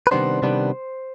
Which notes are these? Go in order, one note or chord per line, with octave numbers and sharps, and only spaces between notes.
B4
C3 D#3 G3 B3 D4 C5
C3 D#3 G3 B3 D4